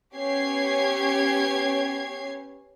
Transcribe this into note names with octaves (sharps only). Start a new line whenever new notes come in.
B3 C#4 G4 C#5 G#6 C7